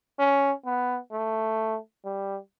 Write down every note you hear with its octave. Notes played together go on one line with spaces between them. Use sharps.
C#4
B3
A3
G3